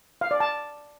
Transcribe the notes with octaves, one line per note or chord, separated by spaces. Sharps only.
F5
D5
A5